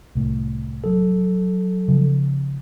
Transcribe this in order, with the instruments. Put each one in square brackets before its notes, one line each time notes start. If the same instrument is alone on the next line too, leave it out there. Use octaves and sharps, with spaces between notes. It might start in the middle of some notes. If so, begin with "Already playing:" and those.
[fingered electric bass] C2 A2
[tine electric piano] F#3 A4
[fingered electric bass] C#3 F3